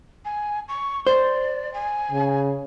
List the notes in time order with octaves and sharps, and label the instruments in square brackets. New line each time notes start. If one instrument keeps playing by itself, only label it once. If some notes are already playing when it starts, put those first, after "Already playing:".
[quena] G#5
C#6
[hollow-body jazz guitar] C5 [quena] D5
[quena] G#5
[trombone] C#3